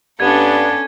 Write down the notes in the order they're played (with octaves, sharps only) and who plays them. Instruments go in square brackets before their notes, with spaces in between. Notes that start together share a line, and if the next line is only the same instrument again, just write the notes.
[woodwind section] G2 [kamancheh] B3 D4 [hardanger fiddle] C#4 A4 [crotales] G#6 D#7